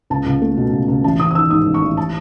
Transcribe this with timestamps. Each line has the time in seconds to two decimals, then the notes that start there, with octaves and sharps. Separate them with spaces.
0.10 C#2 A5
0.26 C#2
0.42 A3
0.57 B2
0.73 C#2
0.88 C#2
1.04 A1 A5
1.20 A1 D#6
1.31 D#6
1.35 D#3 E6
1.50 G#2 D#6
1.67 A1
1.74 C#6
1.82 A1
1.97 A5